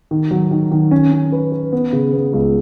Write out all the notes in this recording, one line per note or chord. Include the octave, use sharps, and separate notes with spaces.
D#3
F#3
D#3
D#3
C#4
C#4
B4
B4
B3
C#3
B3
C#2